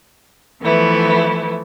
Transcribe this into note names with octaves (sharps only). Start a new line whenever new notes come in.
E3 F3 A3 B3 E4